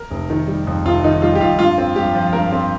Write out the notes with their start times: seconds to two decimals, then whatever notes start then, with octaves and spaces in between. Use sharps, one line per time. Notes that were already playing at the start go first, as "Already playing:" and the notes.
Already playing: A#4
0.11 F1
0.30 D#3
0.48 G3
0.67 F2
0.85 F1 F4
1.04 D#3 D#4
1.22 G3 F4
1.35 G4
1.41 F2 F4
1.59 G2 F4
1.78 C4
1.96 G2 G4
2.15 F3
2.33 G2 A#4
2.52 C4